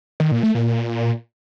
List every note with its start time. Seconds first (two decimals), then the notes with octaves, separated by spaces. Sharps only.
0.20 D#3
0.32 A#2
0.43 A3
0.55 A#2